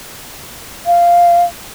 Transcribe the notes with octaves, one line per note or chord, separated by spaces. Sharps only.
F5